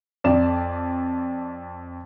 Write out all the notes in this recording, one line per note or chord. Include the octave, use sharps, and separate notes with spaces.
F2 D5 E7